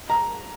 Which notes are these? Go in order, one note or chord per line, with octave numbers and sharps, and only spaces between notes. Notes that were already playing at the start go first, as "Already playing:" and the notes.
A#5